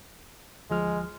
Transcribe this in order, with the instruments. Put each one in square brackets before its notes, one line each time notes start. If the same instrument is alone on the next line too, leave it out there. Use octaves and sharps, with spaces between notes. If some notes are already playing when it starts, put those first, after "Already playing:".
[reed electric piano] D2 F3 F6 [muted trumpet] G#3